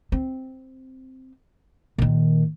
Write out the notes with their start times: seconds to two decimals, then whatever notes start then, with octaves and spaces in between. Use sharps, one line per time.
0.12 C4
1.98 A#2 D#3